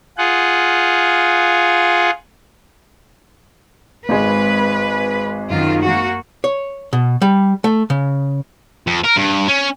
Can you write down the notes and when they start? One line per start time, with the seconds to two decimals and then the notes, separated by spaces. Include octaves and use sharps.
0.18 F4 G#4 F#5
4.09 G#1 G#3 B4
5.51 F#2 D#3 F4
5.83 A#3 F#4
6.44 C#5
6.93 B2
7.22 G3
7.64 A3
7.90 C#3
8.87 F2
9.04 A#4
9.16 G2
9.48 C#4